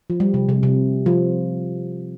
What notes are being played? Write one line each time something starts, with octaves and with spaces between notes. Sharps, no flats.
F3
G3
C3
C3
C3
F3